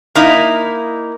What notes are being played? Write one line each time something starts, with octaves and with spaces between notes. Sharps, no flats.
A#3 D#4 E4